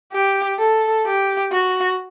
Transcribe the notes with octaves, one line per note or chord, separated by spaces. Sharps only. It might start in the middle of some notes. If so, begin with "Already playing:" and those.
G4
A4
G4
F#4